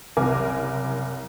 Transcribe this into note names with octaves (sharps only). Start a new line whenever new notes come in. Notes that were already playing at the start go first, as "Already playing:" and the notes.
F#1 C2 A#4 G#5 D6